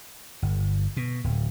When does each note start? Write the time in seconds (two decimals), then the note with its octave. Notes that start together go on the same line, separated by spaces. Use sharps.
0.42 G1
0.97 B2
1.24 D1